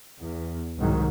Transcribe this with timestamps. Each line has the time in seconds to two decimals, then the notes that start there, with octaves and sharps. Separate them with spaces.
0.19 E2
0.78 C2 G#2 D#3 F#3